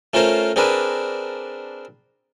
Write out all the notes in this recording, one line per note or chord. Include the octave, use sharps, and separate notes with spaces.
A3 C#4 F4 A#4 C5
C4 D4 G#4 A#4 B4